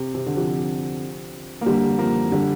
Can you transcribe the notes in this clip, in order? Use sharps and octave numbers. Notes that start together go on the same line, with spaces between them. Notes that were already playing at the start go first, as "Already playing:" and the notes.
Already playing: C3
C3
D3
C3 F3
A#3
D3 G3
F3 A#3
D3 G3